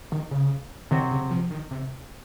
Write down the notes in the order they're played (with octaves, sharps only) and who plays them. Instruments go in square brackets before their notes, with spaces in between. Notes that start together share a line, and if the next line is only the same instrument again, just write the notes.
[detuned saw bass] D#3
C#3
[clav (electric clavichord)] C3 F#3 C4 F#4 [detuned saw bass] D#3
[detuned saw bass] C#3
F3
D#3
C3